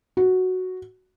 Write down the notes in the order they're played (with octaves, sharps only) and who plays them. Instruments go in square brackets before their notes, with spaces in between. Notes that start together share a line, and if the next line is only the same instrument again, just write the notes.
[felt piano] F#4